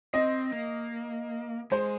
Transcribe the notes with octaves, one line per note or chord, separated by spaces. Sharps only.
C4 D#5
A#3
G#3 C5